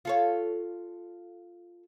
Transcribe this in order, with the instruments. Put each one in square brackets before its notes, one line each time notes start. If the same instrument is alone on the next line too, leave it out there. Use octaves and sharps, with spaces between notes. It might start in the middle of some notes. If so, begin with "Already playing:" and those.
[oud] F4 A4 C#5